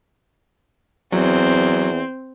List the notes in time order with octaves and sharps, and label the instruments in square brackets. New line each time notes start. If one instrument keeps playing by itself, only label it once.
[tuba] E2 [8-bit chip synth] F#3 [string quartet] C4